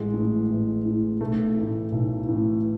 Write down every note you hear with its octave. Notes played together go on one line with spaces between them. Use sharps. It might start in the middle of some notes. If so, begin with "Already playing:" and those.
Already playing: A1 G#3
A2 E3
A1
A2 E3
B1 A3
A2 E3
B1
A2 E3